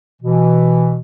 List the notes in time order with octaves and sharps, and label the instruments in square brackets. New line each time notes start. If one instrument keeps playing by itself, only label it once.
[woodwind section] B2 E3